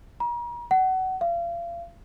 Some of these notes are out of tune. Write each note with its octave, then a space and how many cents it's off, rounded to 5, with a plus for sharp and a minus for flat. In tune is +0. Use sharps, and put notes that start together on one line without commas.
A#5 +40
F#5 +25
F5 -35